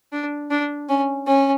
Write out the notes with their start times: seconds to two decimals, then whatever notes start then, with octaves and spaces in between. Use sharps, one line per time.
0.12 D4
0.51 D4
0.89 C#4
1.27 C#4